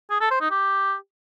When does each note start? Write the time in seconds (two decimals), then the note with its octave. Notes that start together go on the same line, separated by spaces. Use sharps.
0.10 G#4
0.21 A4
0.31 C5
0.41 D#4
0.51 G4